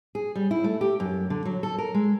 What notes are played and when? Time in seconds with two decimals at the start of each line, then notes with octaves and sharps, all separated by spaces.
0.15 G#4
0.35 G3
0.51 E4
0.64 A3
0.81 G4
1.00 F#2
1.30 D3
1.45 F#3
1.63 A4
1.78 A#4
1.94 G#3